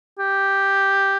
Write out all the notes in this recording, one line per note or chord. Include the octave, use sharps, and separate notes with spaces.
G4